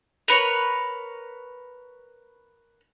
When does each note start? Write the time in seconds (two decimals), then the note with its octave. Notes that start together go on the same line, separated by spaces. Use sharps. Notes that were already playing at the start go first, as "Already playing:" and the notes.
0.28 A#4 B4 C#5